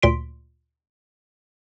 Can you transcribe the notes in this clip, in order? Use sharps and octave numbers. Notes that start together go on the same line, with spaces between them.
D2 A#2 C6 B6 D7